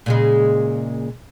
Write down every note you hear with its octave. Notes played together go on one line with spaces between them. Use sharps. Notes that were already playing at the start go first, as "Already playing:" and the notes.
A#2 C#3 G#3